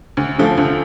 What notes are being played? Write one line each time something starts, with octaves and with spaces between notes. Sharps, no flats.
D2
D3 F3 A3
D2